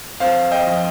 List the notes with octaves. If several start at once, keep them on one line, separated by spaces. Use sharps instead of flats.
F2 C5 F5
D#5 G5
F3